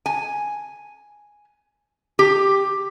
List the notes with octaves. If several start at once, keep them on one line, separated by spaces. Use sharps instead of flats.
G#5
G4